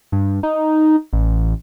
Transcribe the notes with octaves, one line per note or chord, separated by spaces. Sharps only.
G2
D#4
A1